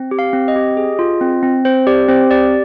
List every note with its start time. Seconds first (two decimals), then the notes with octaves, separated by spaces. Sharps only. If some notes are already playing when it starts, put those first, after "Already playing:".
Already playing: C4
0.11 G4
0.19 F5
0.33 C4
0.48 D#5
0.56 G4
0.77 G#4
0.99 F4
1.21 C4
1.43 C4
1.65 C4 C5
1.87 G4 D5
2.08 C4 C5
2.31 G4 D5